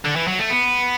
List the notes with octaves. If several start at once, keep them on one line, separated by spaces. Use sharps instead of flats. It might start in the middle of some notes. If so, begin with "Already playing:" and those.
D3
E3
F#3
A3
B3